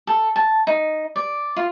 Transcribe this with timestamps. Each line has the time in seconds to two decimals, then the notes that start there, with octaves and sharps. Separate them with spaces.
0.07 A4
0.36 A5
0.67 D#4
1.16 D5
1.56 F4